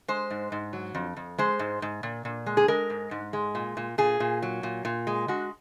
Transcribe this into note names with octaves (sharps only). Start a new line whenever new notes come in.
G#3 C5
G#2
G#2
F#3
F2
F2
G#3 C5
G#2
G#2
A#2
A#2
G#3
G#4
G#3 A#4
G#2
G#2
G#3
A#2
A#2
A#2 G#4
A#2
F#3
A#2
A#2
G#3
G#3 F#4